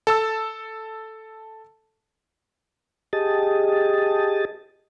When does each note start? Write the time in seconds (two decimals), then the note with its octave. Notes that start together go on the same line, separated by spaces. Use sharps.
0.07 A4 A5 E6
3.13 G4 G#4 D#5 A5